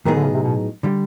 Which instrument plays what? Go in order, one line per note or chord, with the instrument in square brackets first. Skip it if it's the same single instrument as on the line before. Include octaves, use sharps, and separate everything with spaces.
[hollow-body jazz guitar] A2 F#3 B3 D#4 G#4 [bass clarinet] D#3
[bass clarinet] D3
C#3
C3
B2
[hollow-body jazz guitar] D3 G3